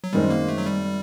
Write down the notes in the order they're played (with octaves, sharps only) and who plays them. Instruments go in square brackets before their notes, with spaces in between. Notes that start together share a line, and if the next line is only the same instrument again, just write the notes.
[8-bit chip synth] F#3
[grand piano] F#2 D#3 G#3 C4 [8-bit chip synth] G3
[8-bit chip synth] A#3
A3
F#3
G3